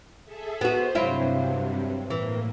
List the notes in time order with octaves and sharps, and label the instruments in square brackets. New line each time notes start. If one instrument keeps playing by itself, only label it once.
[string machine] G#4 A4 E5
[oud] B3 F#4 [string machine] C5
[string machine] G2 C3 [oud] F#3 E4 F4
[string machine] A2 A#3 [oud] E3